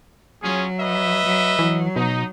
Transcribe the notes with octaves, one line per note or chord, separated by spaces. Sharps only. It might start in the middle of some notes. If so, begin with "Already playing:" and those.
F#3 C#4 F4 G#4
B4 D#5 E5
F#3
E3 F#3
B2 D#4